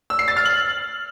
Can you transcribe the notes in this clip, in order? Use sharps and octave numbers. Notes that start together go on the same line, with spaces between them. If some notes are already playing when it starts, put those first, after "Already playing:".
E6
C7
A6
F6
F#7